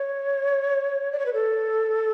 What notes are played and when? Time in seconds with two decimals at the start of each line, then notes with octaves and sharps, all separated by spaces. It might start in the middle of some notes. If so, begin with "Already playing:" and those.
Already playing: C#5
1.12 D5
1.19 C#5
1.26 B4
1.34 A4